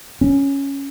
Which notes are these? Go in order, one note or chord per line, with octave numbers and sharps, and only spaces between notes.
C#4